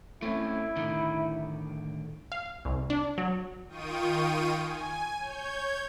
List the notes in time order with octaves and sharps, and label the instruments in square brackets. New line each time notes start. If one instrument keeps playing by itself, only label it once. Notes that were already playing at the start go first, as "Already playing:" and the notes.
[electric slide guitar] A3 C4 C#4 [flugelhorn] E4
[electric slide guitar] A2 D3 D#3
[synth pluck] F5
C2
D4
F#3
[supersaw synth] D#3 F4 G5 C#6 D#6 D#7
G#5
C#5 G6 G#6